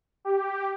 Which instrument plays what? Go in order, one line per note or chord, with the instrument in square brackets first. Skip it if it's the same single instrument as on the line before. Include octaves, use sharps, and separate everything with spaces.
[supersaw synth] G4